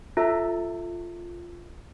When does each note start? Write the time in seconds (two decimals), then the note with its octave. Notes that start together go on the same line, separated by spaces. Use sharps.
0.17 F4 A4 E5 A#5